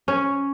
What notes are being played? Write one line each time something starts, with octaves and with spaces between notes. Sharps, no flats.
C#4